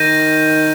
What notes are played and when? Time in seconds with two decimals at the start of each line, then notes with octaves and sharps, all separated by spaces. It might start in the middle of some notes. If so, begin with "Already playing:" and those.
Already playing: D#3 G6 A#6 D#7